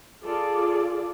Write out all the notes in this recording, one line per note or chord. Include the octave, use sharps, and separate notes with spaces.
F4 G#4 A4 D5